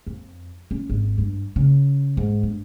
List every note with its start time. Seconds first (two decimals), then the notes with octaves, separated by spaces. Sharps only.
0.07 F2
0.71 C#4
0.90 G#1
1.18 G2
1.56 C#3
2.17 G#2
2.43 G2